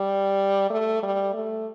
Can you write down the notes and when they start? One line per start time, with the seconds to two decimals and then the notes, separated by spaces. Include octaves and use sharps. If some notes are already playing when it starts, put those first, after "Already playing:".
Already playing: G3
0.70 A3
1.03 G3
1.34 A3